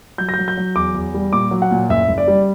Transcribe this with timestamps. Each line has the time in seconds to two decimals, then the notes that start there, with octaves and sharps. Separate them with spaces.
0.18 F#3 G6
0.29 A#6
0.34 F#3 G6
0.48 G6
0.57 F#3
0.75 E2 D6
0.94 E2
1.14 G3
1.33 A#2 D6
1.51 F#3
1.62 F#5
1.71 A#2
1.89 F#1 E5
2.09 F#1
2.18 D5
2.28 G3